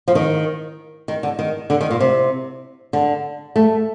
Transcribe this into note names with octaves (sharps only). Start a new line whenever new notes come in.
F3
D#3
D#3
D3
D#3
D3
D#3
A#2
C3
D3
A3